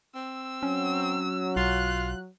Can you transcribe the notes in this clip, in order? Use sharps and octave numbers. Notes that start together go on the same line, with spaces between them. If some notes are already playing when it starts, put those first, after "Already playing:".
C4 E6
F#3 C#4
B1 F4 F#6